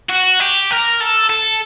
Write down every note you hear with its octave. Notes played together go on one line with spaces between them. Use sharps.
F#4
G4
A#4
A4
A4